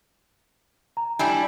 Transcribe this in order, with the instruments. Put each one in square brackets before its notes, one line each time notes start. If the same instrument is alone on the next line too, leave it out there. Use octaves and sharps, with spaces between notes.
[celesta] A#5
[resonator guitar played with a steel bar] G3 D4 E4 [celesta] G#5